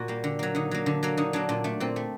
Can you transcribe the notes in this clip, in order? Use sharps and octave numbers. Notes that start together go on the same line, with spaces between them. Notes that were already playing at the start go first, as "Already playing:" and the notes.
Already playing: A#2 F#4
G3 A#3
D3
F#3 A#3
D3 D#4
F#3 A#3
D3
F#3 A#3
D3 D#4
F#3 A#3 D4
A#2 D4
A3 D4
A#2 C4
A3